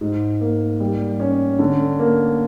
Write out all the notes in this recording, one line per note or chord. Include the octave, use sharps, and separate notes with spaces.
G#2
A#3
G3
C#4
D3
A#3